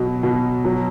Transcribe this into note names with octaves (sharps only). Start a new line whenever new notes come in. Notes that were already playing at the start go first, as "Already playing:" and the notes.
Already playing: B2 F#3
B2
F#3